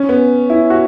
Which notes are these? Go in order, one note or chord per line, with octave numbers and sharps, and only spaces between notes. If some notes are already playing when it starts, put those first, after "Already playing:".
Already playing: C#4
B3
E4
F#4